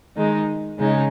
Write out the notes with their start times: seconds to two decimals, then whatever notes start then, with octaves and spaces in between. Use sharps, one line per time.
0.15 D#3 G#3 D#4
0.78 C#3 G#3 D#4